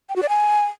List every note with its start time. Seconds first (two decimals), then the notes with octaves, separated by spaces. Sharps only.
0.09 G5
0.16 F#4
0.22 D5
0.29 G#5